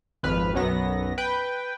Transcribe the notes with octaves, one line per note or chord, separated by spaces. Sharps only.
G#1 F2 B4 B5 F6
B1 F#2 F#3 B3 A#6
B4 G5